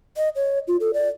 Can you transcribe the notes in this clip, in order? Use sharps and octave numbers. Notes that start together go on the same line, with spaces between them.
D#5
C#5
F4
A4
D5